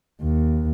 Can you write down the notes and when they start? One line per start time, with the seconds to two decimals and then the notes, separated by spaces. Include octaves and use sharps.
0.22 D#2